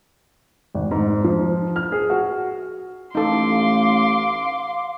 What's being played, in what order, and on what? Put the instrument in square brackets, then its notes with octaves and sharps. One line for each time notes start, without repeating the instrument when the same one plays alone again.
[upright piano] G#1
G#2
F3
F6
G#4
F#4
[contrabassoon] A1 [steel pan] D#4 A4 [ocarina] F5 [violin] C6 D6